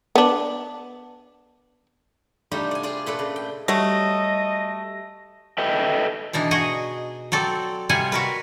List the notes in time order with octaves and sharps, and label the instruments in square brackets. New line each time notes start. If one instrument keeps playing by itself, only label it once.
[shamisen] B3 D4
[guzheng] C3 G3 A3 D4 D#4 F4
D5 G#5
F4 G#4 D5 G#5
A#2 A3 A4 B4 D5
C#3
G5
[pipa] F#3 A3 [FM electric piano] G3 A#6 [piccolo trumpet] D#5
[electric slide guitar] A4 B4 D#5 E5 G5
[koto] B2 E3 D4 D#4
F#4 G#4 D#5
F#3 C4 A4 D5
C3 G3 F4 F#5 G#5
F#4 A#4 B4